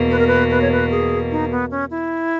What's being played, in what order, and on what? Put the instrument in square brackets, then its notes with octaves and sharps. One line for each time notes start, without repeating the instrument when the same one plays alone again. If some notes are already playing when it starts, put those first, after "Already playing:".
Already playing: [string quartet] E2 B2 A#3
[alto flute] B4
A#4
B4
B4
C#5
B4
G#4
D#4
B3
C#4
E4